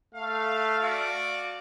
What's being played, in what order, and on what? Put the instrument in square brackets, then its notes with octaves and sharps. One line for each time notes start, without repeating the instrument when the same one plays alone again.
[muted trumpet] A3 [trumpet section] F5
[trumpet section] F#4 D5 F5